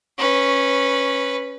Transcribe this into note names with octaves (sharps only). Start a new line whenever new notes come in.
C#4 B4